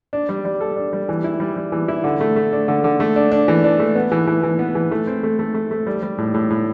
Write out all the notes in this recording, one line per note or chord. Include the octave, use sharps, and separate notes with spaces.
D4
G3
G3
A4
D4
G3
E3
E4
G3
G3
E3
E4
D3
A3
A3
D4
D3
D3
A3
D4
D4
E3
D4
A3
B3
E3
E3
E3
B3
E3
A3
C4
A3
A3
A3
A3
G3
G3
A2
A2
A2